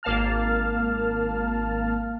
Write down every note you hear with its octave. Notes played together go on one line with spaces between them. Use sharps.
G#1 A#3 F5 A5 F6